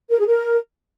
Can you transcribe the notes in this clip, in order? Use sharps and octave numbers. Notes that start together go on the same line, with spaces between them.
A#4
G#4
A#4